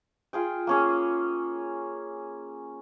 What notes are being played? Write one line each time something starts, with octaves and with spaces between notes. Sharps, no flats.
F4 G#4 G5
A#3 C#4 G#4